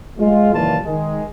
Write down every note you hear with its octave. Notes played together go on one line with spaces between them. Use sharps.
G#3 F4
F#1 D#2 A#2 E3 F4 A5
D#3 G#3